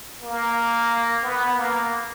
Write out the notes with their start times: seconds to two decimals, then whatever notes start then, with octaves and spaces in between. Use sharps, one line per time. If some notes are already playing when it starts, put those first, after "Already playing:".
0.22 A#3
1.23 B3
1.57 A#3